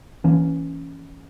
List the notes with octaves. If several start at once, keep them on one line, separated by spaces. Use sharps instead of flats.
E3 A#3 C#4